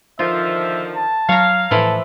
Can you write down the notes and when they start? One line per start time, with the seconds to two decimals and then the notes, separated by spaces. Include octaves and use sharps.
0.19 D3 D#3 F3 F4 E5
0.96 A5
1.29 F#3 C#5 F5 A#5
1.71 A2 E3 F3 E4 A4